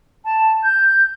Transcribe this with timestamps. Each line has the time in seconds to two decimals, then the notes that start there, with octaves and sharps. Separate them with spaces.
0.24 A5
0.62 G6